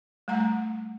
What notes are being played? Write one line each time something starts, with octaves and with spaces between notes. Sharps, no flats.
G3 A3 F#5 A#5